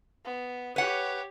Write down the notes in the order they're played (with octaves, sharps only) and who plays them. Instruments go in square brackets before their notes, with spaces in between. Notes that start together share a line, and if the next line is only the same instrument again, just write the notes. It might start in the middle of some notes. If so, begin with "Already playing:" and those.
[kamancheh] B3
[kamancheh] G4 C#5 [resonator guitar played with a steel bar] B4 F#5